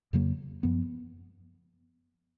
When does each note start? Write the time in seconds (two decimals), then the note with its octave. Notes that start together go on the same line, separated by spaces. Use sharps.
0.13 F2 C#3 F#3 A#3
0.63 F#2 F3 B3